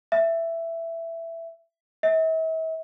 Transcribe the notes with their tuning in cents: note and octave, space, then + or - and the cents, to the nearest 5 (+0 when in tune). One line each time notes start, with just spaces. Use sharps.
E5 +10
E5 -40